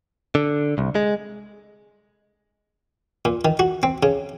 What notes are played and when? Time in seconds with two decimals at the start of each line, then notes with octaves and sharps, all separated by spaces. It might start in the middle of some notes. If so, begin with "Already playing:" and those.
0.35 D3
0.78 C2
0.95 G#3
3.25 A#2
3.45 D#3
3.59 F#4
3.83 C4
4.03 C#3